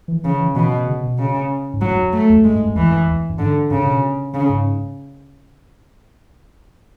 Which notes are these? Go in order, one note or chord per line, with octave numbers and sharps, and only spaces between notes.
E3
C#3 E3
E3
B2 E3
C#3
B2
C#3
G#2
A2 F#3
G#2
F#2
A3
E2
F#2 G#3
G#2
F#2
E2 E3
F#2
E2
F#2
G#2 D3
G#2 C#3
B2
C#3
G#2